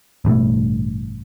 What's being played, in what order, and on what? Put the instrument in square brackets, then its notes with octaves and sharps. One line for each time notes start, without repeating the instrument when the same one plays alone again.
[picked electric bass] A1 G2 B2 A3